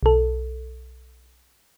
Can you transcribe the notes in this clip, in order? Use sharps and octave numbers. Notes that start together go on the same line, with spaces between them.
B1 A4